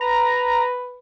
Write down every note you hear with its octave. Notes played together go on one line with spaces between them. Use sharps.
B4 A#5